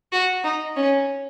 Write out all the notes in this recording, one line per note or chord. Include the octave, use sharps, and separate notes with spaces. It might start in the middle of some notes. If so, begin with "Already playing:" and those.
F#4
D#4
C#4